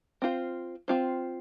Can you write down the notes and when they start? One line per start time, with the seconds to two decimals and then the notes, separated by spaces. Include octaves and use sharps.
0.22 C4 F4 C5
0.88 C4 F4 C5